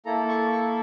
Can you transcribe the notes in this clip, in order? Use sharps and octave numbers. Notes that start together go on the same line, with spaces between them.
A#3 E4 A4 A#5
C#6
C#6